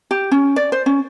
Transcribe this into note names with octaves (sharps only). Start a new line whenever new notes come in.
G4
C#4
D5
C5
C#4